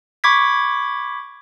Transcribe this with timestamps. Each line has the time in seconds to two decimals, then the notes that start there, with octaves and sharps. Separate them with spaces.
0.24 B5 C#6 D6 G#6 B6